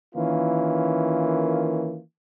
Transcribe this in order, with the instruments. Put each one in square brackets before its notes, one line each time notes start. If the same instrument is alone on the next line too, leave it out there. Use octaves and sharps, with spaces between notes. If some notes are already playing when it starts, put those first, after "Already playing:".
[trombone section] D#3 E3 A#3 C#4 F4